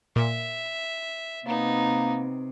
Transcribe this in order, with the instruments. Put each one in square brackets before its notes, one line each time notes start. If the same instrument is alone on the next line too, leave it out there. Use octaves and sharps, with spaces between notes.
[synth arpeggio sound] A#2 [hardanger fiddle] E5
[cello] C3 [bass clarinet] A#3 [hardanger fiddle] B3 D#4